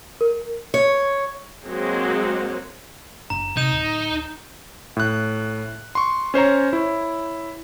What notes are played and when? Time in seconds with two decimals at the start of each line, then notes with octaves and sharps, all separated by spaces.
0.21 A#4
0.74 C#5
1.64 F#3 G#3 A#3 C4 F#4
3.30 F#1 D4 A#5
3.57 C3 D#4 G6 E7
3.72 D1
4.97 A2 F#6
5.95 C6 C#6
6.34 C#4 C5 C#5 A#5
6.73 E4 C#5